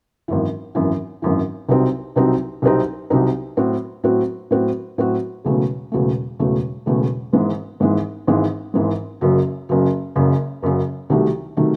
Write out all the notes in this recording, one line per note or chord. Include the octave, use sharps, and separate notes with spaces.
G#1 F#2 E3
G#1 F#2 E3
G#1 F#2 E3
C2 C3 F#3 C4 D#4
C2 C3 F#3 C4 D#4
C2 C3 F#3 C4 D#4
C2 C3 F#3 C4 D#4
A2 F#3 C4 F#4
A2 F#3 C4 F#4
A2 F#3 C4 F#4
A2 F#3 C4 F#4
E1 E2 C#3 F#3 A3
E1 E2 C#3 F#3 A3
E1 E2 C#3 F#3 A3
E1 E2 C#3 F#3 A3
G#1 G#2 E3 G#3
G#1 G#2 E3 G#3
G#1 G#2 E3 G#3
G#1 G#2 E3 G#3
F#1 F#2 C#3 F#3
F#1 F#2 C#3 F#3
F#1 F#2 C#3 F#3
F#1 F#2 C#3 F#3
C2 C3 D#3 F#3 A3
C3 D#3 F#3 A3